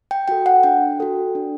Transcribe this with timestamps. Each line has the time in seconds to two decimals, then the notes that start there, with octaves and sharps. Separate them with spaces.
0.11 G5
0.28 F#4 A4 G5
0.46 F#5
0.63 D4 G5
1.00 F#4 A4
1.35 D4